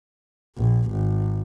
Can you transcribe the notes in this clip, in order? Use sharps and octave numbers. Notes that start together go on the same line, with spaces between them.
A#1
G#1